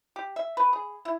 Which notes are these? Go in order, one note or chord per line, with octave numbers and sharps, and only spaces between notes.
G4
E5
B4
G#4
E4